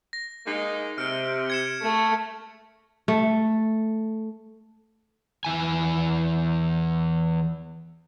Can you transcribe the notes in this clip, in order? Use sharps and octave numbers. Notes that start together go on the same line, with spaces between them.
A#6
G#3 A#3 D#4
C3 F6 D7
G#6 C#7 E7
A3
A3
E2 E3 G#5